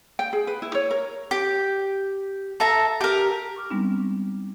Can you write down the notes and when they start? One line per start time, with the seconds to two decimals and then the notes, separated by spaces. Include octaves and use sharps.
0.19 G5
0.33 G#4
0.47 B4
0.62 E4
0.75 C#5
0.91 A#4
1.31 G4
2.60 A4 E5 A#5
3.01 G4 A#4
3.56 C#6 D6 F6
3.70 G3 G#3 B3 C4 D4 D#4